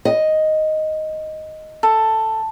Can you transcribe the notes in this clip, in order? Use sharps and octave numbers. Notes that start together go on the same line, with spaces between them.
D#5
A4